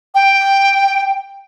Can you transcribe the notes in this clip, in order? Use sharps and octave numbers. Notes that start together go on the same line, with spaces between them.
G5